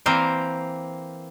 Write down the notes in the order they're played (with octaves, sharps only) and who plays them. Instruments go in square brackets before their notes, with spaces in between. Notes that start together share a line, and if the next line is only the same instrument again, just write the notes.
[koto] E3 A#3 C4 A#4 C5